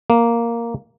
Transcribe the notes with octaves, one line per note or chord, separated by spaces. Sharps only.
A#3